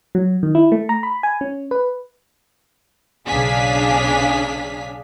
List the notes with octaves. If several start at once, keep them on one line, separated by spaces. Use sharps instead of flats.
F#3
D#3
E4
A3
A#5
B5
G#5
C#4
B4
B1 C#3 D4 G#4 F5 B6